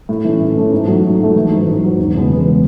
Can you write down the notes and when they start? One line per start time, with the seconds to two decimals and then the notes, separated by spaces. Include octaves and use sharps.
0.09 A2
0.25 E3 A3 C#4
0.40 A2
0.56 E3 A3 C#4
0.73 G#2
0.87 F#3 A3
1.03 G#2
1.20 F#3 A3
1.36 A1
1.51 G#2 F#3
1.67 A1
1.83 G#2 F#3
1.99 E1
2.14 E2 C#3 G#3 B3
2.30 E1
2.47 C#3 G#3 B3